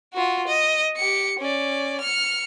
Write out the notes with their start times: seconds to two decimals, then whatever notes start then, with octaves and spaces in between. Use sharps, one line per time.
0.14 F4 F#4
0.48 D#5
0.97 G4 C#7
1.39 C#4 D5
2.01 F6 C#7